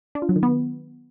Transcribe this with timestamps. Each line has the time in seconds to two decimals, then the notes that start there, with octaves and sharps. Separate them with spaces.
0.15 D4
0.22 F4
0.29 F#3
0.36 D#3
0.43 B3